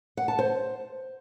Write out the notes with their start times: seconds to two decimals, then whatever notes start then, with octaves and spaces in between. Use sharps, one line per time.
0.17 F#5
0.28 A5
0.39 C5